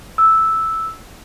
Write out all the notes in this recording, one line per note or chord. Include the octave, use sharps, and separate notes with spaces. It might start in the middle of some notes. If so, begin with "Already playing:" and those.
E6